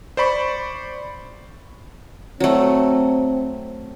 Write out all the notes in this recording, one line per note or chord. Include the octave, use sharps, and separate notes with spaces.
C5 D5 B5 C#6
F#3 A3 C4